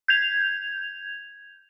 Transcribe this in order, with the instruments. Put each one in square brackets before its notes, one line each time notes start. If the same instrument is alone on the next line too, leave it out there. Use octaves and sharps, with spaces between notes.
[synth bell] G6 G#6 F7